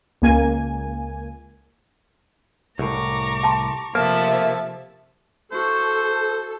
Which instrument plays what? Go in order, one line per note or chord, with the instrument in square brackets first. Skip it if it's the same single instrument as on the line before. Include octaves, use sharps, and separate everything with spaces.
[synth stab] C#2 A#3 G#5
[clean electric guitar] C2 A2 [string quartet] A#5 C#6 D6
[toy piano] G5 A5 C6
[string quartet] C3 F3 A3 [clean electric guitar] A#3 [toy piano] B4 [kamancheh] E5 A5
[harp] E4 F#4 [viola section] A4 [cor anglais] C5